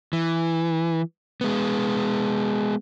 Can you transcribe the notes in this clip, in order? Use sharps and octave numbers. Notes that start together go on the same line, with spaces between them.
E3
G#3 B3